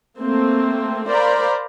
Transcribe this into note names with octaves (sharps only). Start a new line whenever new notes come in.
A3 A#3 C4
A#4 C5 D5 F5 A#5 B5